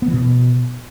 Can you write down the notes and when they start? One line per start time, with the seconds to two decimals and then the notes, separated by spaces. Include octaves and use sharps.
0.02 B3
0.08 E3
0.13 B2